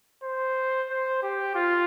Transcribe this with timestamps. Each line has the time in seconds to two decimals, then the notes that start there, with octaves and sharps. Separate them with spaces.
0.24 C5
0.90 C5
1.22 G4
1.55 F4